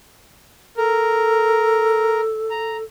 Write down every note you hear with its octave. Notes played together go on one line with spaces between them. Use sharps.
A4 A#4
A#5